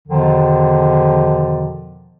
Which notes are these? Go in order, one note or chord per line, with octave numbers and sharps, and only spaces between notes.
E2 B2 D3 D#3 F3